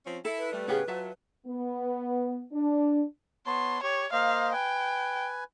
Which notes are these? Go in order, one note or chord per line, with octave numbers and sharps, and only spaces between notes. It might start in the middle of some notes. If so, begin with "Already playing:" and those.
F3 C4 C#4
E4 A4
B4
G3 A3
A2 C#3 B3 C#4 G4 G#4
F#3 F4 E5 A5
B3
D4
B3 C#5 A5 C6
G4 C#5
A#3 C5 D#5 F5
B4 G5 G#5